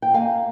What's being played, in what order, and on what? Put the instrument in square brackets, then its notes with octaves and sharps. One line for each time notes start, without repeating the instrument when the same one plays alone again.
[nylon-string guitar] G5
A#3 F5 G#5